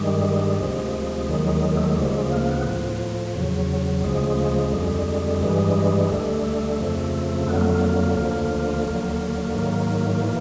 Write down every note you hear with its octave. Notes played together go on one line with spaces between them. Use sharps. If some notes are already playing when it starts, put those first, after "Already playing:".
Already playing: G2 D#3 G3 G#3
D2 C3 F3
D#2 D#3 F#3
A3
G#3
D2 C#3 F3 G3
G#3
A#3
B3
A2 F3
E2 C#3 F#3
D2 C#3 F3 G#3
F2 D3 G3
G2 E3 G3 G#3
D2 D3 G3 A3
F2 C#3 F3
F2 D3 F#3 B3
A#3
A3
A#3
D2 D3 F3
D#2 D3 F#3 A#3
G#2 D#3 F#3
A2 E3